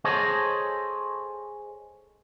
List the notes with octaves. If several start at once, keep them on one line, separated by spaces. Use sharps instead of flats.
G#4 A4 C5 C#5 D#5